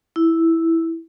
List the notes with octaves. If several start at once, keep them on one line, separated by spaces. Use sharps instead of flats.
E4